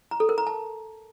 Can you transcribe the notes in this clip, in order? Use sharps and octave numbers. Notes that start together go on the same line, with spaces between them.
A#5
A4
A#4
A#5
A5